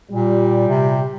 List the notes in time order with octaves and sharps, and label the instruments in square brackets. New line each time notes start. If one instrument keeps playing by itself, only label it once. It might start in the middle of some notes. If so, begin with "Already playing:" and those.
[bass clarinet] A#2 [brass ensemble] G3
[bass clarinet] C3